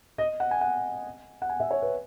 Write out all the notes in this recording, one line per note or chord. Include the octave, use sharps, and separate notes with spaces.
D#5
F#5
G#5
F#5
F#5
G#5
E5
C#5
B4